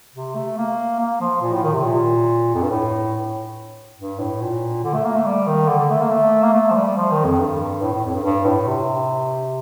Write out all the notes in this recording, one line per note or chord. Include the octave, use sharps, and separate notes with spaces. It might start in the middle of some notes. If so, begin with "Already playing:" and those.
C3
A3
A#3
A#3
F3
A#2
A2
D#3
C3
A#2
F2
G2
A2
G2
A2
A#2
D3
A3
A#3
A3
G3
D#3
D3
D3
A3
A#3
A3
A#3
A3
F3
G3
F3
D#3
F2
G2
A2
A2
F2
G2
G2
A2
C3